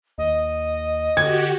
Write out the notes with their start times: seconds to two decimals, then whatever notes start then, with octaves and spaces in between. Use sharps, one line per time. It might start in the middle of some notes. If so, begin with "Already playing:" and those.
0.18 D#2 D#5
1.17 D3 F#4 G4 G#6